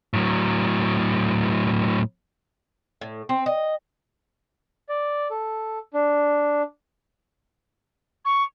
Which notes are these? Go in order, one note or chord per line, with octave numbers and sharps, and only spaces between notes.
A2 F#3
A2
C4
D#5
D5
A4
D4
C#6